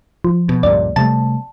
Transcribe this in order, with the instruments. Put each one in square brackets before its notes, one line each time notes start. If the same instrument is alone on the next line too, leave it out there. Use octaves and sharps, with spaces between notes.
[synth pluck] F3
[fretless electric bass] B2
[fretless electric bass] C#2 G2 A#2 [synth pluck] D5
[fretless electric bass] C3 G3 A3 [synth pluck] A5